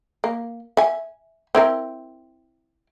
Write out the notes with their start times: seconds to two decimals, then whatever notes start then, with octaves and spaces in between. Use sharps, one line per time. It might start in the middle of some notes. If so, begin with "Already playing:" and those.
0.24 A#3
0.77 E5 G#5
1.55 C4 E4 A#4